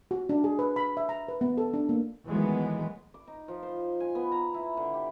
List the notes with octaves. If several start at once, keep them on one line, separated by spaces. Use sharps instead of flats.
F#4
D4
G#4
B4
B5
E5
A#5
B4
B3
A4
D4
A#3
D#3 E3 F#3 G#3 A3 B3
D6
D#4
F3
C5
G#5
B3
A#5
E4
D3
G4